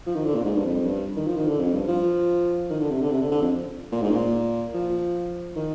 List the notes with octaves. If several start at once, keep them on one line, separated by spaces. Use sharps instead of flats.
F3
D#3
D3
A#2
G#2
G2
F2
G2
D#3
F3
D#3
D3
F2
G2
F3
D#3
D3
C3
D3
C3
D3
D3
F2
A#2
G#2
A#2
F3
D#3